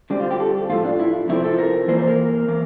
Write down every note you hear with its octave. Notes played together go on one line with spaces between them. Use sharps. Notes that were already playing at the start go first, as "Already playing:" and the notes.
D3 G3 C4 D4
F4
G4
A4
A2 F3 A3 F4
D4
E4
C3 F3 C4 E4
A4
A#4
E3 A#3 C5
C5
A#4
E3 A#3